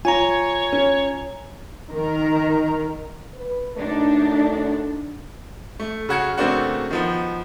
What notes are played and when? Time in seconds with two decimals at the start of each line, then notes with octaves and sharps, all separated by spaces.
0.05 F4 C#5 G#5 A#5
0.72 C#4
1.91 D#3 A#4
3.35 B4
3.77 F#2 D3 A3 D4 D#4
5.80 A3
6.09 C#3 F#4 G#6 C#7
6.38 C#3 A3 A#3 C4 D4 F#4
6.91 D#3 F3 B3